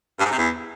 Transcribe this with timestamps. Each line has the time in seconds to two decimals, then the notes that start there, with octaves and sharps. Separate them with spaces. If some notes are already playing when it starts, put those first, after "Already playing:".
0.19 G2
0.25 G#2
0.31 C3
0.37 E2